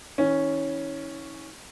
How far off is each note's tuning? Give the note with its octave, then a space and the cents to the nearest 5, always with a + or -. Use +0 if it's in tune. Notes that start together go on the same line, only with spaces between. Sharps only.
E3 -45 C#4 +0